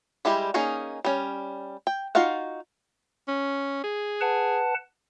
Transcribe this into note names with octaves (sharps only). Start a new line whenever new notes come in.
G3 G#3 E4 G4
A#3 C#4 D#4 G#4
G3 C#4
G5
D#4 F4 F#4 F5 F#5
C#4
G#4
B4 F#5 A5